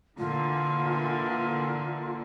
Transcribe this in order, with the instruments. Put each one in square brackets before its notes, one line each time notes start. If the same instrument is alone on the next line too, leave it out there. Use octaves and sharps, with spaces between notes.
[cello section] A#2 D3 E3 [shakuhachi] F4